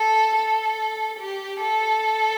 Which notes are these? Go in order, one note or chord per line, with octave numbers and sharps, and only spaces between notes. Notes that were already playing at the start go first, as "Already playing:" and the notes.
Already playing: A4
A4
G4
A4